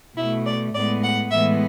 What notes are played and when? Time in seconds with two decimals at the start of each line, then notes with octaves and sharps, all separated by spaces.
0.17 B2 A3 E4
0.46 D5
0.74 A2 G#3 B3 D5
1.03 F#5
1.31 A2 E3 G#3 B3 E5